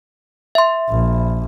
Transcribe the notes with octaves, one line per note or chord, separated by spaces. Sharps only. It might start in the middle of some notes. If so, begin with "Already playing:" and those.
E5 C6
A#1